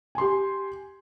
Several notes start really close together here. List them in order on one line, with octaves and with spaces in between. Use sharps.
G#5 C6 G4